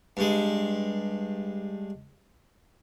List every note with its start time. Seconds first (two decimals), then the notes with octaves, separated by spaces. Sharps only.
0.17 G2 G#3